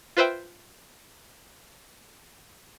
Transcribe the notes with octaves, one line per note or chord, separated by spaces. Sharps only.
F4 B4 C5 E5 G5